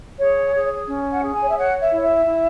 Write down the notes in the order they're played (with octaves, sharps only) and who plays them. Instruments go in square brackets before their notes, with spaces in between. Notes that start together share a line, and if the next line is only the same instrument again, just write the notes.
[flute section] G#4 C#5
G#4
C#4
F#5
G#4
G#5
C#5
E5
C#5 F#5
E5
E4 C#5
E5
E4